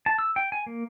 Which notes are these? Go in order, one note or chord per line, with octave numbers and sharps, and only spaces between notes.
A5
E6
G5
G#5
A#3